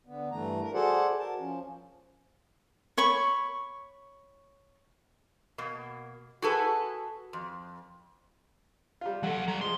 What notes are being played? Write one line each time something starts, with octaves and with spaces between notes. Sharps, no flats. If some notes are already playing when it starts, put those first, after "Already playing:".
D3 B3
G2 E3 A3 A#5
A#4
F#4 G#4 A4 C5 D5 F#5
A#4 A5
F3 C#4
C#5 B5 C#6
B2 A#3
F#4 G#4 A4 B4
F2
G3 F4
F#3 A4 F#5
G3 A#5
F3 G#3 C6